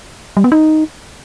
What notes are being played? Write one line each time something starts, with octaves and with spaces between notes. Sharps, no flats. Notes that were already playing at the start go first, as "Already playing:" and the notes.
G3
B3
D#4